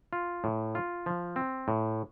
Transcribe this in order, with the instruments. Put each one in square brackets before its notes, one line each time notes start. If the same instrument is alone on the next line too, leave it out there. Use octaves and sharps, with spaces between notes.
[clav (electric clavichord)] F4
A2
F4
F3
C4
A2